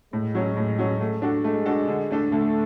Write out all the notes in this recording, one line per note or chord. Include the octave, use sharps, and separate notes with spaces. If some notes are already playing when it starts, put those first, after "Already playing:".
A2 G#3
F#3 C#4
A2
F#3 C#4
A3
D4 F#4 A4
G#3 A3
D4 F#4 A4
D3
A3 D4 A4
D3 A3